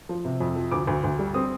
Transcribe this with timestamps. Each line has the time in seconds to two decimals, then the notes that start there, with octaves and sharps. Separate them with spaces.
0.09 F3
0.25 C3
0.40 F2
0.56 F3
0.71 D2 D6
0.87 D2
1.04 D2
1.19 G3
1.34 C4 D#6